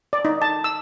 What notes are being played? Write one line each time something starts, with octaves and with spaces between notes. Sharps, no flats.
D5
D#4
A5
E6